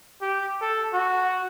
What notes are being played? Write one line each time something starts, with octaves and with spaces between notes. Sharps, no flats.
G4
A4
F#4